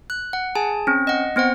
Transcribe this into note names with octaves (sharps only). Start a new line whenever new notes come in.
F#6
F#5
G#4 G#5 A5
C4 C#4
D#5 F#5
B3 C4 C5 F#5